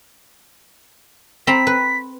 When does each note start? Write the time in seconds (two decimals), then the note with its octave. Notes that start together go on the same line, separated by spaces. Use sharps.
1.47 C4 A#5 B5 B6
1.67 B4